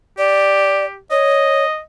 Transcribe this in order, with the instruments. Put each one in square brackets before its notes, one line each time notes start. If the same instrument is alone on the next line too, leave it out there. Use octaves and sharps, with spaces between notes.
[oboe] G4 [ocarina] D5
[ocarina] C#5 [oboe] D#5